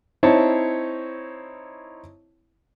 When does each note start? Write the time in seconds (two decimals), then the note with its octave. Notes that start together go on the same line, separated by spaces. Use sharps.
0.23 C4 D#4 E4 C5 C#5 A5